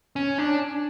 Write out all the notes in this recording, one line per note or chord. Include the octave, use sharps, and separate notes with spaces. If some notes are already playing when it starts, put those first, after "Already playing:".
C#4
D4